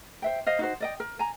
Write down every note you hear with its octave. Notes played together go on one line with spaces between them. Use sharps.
C5 E5 G5
C5 D#5 F5
D#4 F#4 C5
D5 D#5 G5
A#4
G#5 A#5